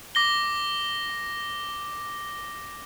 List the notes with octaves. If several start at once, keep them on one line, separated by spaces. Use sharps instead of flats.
D6 A#6 G7